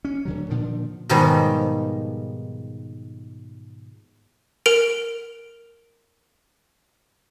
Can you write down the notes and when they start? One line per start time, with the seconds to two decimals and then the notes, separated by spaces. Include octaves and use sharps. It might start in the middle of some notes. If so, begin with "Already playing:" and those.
0.05 C#4
0.25 D1 D3 F#3
0.50 A#2 D3 D#3 F3
1.09 G#2 B2 D#3 F3 G3 G#3
4.66 A#4 D7 F7